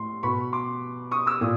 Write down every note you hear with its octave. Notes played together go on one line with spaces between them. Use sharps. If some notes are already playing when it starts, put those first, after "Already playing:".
Already playing: A2 C6
B2 B5 C#6
C6 D6
C#6 D#6
D6 E6
A#2 D#6